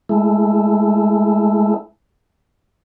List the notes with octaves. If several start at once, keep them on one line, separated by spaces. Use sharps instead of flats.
G#3 A3 E4